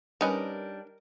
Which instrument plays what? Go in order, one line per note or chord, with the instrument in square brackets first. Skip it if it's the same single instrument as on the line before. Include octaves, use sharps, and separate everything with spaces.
[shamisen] D#3 C#4 B4 [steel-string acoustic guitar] G3 D4 [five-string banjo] A#4 D#5